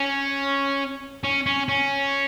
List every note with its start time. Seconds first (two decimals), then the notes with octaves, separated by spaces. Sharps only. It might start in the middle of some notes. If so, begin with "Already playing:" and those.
Already playing: C#4
1.24 C#4
1.46 C#4
1.69 C#4